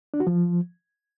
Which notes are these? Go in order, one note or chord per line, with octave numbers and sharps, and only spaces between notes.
D4
F#4
F3